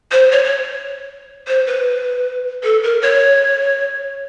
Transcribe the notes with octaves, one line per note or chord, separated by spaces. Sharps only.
C5
C#5
C#5
C5
B4
A4
A#4
C#5